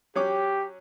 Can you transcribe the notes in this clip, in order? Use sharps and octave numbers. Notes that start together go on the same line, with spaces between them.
F#3 C#4 G4 D6